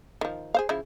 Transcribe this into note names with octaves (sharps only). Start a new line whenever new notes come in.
D#3 F3
G#4 C5 F5
C#3 F3 E4